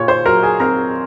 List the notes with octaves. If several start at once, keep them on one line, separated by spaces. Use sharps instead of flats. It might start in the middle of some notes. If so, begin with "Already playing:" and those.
Already playing: A#2 C#5 C#6
C5 C6
F#3 A#4 A#5
G#4 G#5
C4 A#4 A#5